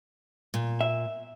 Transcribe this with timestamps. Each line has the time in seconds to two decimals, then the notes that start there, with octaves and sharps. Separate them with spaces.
0.54 A#2
0.81 E5